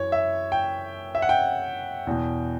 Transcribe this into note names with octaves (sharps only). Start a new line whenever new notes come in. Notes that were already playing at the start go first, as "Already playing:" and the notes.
Already playing: F#2 E3 C#5
E5
G5
E5
F#5
G5
E2 B2